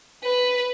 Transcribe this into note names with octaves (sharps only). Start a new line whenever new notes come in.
B4